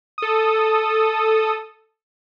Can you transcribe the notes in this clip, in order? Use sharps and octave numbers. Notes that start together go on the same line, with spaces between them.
A4 D#6